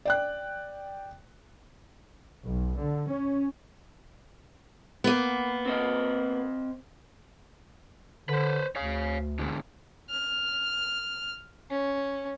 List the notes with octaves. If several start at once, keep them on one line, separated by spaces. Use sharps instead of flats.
D5 G5 F#6
B1
D3
C#4
A#3 B3
C4 C5 D#5
D3 B4 C5
D2 C#5 F5
G#2 D3 G#3
F6
C#4